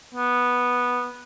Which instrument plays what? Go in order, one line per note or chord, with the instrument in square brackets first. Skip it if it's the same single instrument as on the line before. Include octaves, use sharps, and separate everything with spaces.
[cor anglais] B3